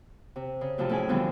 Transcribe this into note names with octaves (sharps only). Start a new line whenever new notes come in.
C3
C#3
F#2 A2 C3 F3 F4 A5
A2 C#4 E4 G#4 E5 G#5
D3 E3 F3 G3 B3 C4